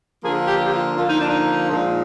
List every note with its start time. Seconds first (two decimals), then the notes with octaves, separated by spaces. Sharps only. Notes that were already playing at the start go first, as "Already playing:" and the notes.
0.23 D3 F3 A#3 G#4
0.46 G4
0.63 G4
0.72 F4
0.96 D3 F3 A#3 F4
1.07 D#4
1.19 D4
1.30 D#4
1.69 A#2 F3 G#3